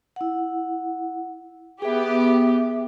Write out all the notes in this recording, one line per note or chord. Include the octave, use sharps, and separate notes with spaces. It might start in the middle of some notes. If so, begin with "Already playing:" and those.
E4 F#5
B3 G4 G#4 E5